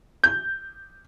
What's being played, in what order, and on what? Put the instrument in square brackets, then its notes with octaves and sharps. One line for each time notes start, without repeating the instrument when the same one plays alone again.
[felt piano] G6